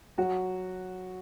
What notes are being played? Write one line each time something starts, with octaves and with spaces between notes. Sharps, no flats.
F#3 F#4